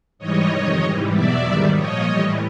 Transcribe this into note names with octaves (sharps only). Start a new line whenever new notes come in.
G#2 E3 G3 C#5 D#5
F2 C3 D#3
G#2 E3 G3
E2 B2 F#3 D5 E5
G#2 D#3 G3
A#2 F3 C#5 D#5
A2 E3 G3